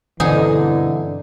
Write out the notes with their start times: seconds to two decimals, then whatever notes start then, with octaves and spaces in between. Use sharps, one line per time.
0.20 G2 B2 D3 E3 C4 D#4 G#4 G#5